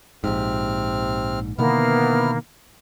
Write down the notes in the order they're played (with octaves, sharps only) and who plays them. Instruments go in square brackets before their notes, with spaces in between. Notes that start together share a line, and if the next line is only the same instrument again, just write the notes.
[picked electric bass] A#1 G#2 [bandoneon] C3 C4 F6
[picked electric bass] B2 D3 D#3 [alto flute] A#3 [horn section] B3 [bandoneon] E4 F6